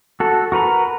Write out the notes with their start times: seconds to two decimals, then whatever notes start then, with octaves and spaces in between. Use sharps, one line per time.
0.20 F#4 A4
0.52 F#4 A#4 B4 A#5